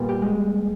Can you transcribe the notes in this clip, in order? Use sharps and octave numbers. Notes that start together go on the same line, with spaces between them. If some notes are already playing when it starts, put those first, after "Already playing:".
Already playing: A#2 G3 B3
G4
G#3